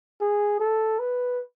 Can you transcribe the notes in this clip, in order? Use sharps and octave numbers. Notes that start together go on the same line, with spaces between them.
G#4
A4
B4